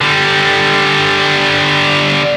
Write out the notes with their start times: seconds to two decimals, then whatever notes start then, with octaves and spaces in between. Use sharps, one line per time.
0.01 D3 G3